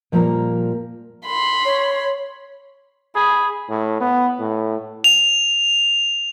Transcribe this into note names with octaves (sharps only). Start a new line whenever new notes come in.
A#2 F3 G3 A3 A#3
B5 C6
C#5
G#4 B5
A2
B3
A2
F7